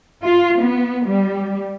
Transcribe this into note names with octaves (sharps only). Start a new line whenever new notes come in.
F4
B3
G3